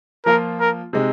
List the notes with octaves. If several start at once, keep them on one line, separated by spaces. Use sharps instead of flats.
F3 A#3 F4 A#4
A#4
C3 G#3 D#4